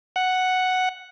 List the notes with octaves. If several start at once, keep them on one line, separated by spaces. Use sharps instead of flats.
F#5